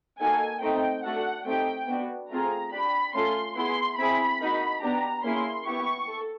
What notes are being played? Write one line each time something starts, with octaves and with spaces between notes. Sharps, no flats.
A#3 D#4 F#4 A4 G#5
A3 C4 D#4 G5
A3 D4 F#4 A4 F#5
A3 C4 D#4 G4 G5
B3 D4 F#4
A3 C4 F4 G#4 A#5
D4 G4 B5
A3 C#4 F4 A4 C6
B3 E4 G#4 C6
C4 E4 G#4 B5
A#3 D#4 F#4
B3 D4 G4 A#5
A#3 C#4 E4 G#4 C6
B3 E4 G4 C#6
A4